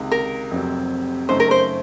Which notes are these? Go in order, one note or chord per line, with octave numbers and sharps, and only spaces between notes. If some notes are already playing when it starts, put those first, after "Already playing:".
Already playing: C#2 C3 D#3
A#4
F1 F2 C3 F#3 C4
F#2 C#3 A3 D#4 C5
A#4
C5